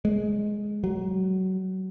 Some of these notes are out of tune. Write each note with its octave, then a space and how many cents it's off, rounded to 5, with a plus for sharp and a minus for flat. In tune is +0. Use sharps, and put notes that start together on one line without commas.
G#3 +5
F#3 +20